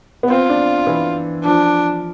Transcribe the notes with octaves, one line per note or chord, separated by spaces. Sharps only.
B3
C4 F4
D4
E3
F3 D4